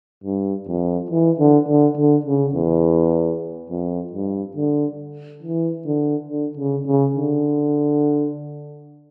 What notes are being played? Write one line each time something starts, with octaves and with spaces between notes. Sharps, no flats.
G2
F2
E3
D3
D3
D3
C#3
E2
F2
G2
D3
E3
D3
D3
C#3
C#3
D3